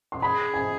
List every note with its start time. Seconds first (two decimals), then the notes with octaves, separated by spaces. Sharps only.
0.12 C6
0.22 G#4 B5
0.54 G#5